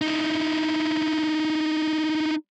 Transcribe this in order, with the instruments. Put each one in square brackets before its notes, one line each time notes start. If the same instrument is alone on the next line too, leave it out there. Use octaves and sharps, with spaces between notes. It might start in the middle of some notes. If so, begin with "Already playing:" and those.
[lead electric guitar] D#4 E4